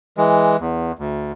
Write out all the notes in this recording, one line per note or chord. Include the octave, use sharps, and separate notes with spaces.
E3 G#3
E2
D2